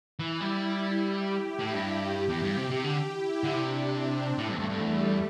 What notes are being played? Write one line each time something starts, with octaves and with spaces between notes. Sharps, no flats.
E3 E4
G3
E4
G4
E4
A2
G2
G4
E2 G4
G2
C3
C3 G4
D3
E4
D3
C3 D4
C4
A2 A3
G2
E2
G2
G2
E2 G3